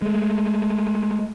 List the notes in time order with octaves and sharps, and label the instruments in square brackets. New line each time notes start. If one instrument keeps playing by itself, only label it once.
[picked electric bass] G#3 A3